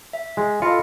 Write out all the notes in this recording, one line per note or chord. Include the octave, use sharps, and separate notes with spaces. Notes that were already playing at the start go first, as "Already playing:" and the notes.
E5
G#3
F4 A4 D#5 B5 C#7